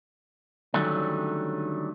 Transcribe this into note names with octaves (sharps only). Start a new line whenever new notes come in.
D3 D#3 F#3 G3 A3 C#4